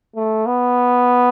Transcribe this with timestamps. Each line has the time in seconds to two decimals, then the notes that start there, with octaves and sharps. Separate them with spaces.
0.16 A3
0.46 B3